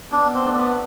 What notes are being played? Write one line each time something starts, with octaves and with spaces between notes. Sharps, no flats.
B2 D4
C4
A3 D4 A4
B3